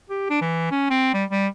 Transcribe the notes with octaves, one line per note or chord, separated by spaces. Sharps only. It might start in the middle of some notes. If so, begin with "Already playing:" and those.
G4
D4
E3
C#4
C4
G3
G3